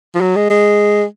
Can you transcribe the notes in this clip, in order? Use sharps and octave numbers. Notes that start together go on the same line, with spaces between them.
F3
F#3
G#3
G#3